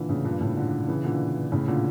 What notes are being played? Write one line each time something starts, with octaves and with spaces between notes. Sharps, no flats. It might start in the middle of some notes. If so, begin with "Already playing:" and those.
Already playing: A#2 D3 E3
A2 C#3
G2 A#2
A2 C#3
A#2 D3
C#3 E3
A#2 D3
A2 C#3
A#2 D3